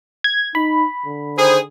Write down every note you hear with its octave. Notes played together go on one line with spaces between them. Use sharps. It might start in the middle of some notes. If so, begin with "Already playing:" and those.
G#6
D#4 B5
D3
D#3 G#4 C5